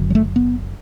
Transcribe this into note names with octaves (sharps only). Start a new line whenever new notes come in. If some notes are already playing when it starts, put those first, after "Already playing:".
Already playing: F#1 F#2 D3
F#3
A3
B3